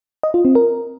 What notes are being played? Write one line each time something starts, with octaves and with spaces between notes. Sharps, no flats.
D#5
F4
C4
A#4